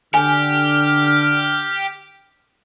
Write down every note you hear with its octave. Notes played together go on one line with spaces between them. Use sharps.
D3 G4 G#5 F6